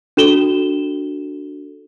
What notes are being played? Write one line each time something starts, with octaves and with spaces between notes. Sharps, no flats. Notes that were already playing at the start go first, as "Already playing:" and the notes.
D4 F#4 A4 E7 G7